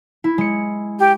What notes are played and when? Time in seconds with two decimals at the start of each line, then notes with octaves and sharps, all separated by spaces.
0.24 E4
0.38 G#3 C#7
0.99 G4